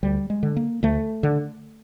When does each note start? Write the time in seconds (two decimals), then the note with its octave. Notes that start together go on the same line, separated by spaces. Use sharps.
0.03 D2 G3
0.30 G#3
0.43 D3
0.57 A#3
0.83 D2 A3
1.23 D3